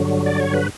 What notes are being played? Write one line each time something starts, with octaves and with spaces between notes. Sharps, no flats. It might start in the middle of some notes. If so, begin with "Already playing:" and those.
Already playing: G2 D3 F#3
D5
C#5
B4